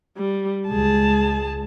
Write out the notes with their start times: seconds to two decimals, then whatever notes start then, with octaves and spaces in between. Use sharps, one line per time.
0.17 G3
0.68 C#2 G#3 G#4 A5